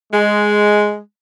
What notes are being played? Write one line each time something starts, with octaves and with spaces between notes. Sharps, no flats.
G#3